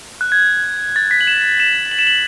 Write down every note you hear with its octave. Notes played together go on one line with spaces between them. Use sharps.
F#6
G#6
A6
B6
F#7
E7
E7
F#7
E7
F#7